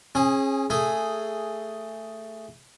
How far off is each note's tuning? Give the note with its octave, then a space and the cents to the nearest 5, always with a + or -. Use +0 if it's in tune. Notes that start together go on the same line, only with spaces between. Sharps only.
C#4 -35 G#4 +0
A3 +10 G#4 +0